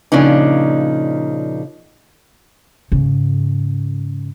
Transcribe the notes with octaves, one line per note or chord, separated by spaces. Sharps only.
A#2 C#3 F3 D4 D#4
G#2 C#3